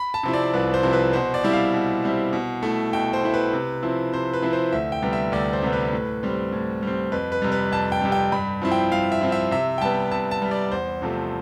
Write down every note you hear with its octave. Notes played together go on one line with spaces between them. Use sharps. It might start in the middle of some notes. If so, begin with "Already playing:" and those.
Already playing: B5
A5
C3 F3 C4 E4
D5
C2 B4
C5
C3 F3 C4 E4
B4
B2 C5
D5
G3 C4 E4
F5
B2
G3 C4 E4
B2
A3 E4
B2 G5
C5
A3 E4
B4
C3
F3 C4 E4
C3 C5
B4
F3 C4 E4
C5
D2 E5
G5
C3 G3 B3
E5
D2 D5
C5
C3 G3 B3
B4
A2
G3 C4
A2
G3 C4
F2 B4
B4
C3 G3
B4
F2 A5
G5
C3 G3
G5
G2 B5
F3 C4 E4
G5
G2 F5
E5
F3 C4 E4
E5
C3 E5
G5
G3 B3 A5
C3 A5
A5
G3 B3
D5
E2 C5
C3 F3 A3